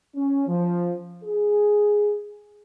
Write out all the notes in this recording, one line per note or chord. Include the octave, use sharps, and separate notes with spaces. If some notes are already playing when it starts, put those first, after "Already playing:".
C#4
F3
G#4